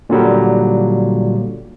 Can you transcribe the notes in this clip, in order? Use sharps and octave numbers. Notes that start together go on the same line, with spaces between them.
A#2 D3 F#3 G3